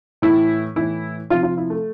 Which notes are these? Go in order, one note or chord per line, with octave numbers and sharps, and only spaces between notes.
A2 E3 E4
A2 E3 E4
C3 F3 F4
F4
E4
A3